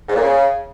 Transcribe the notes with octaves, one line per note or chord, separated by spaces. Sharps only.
G#2
A#2
C#3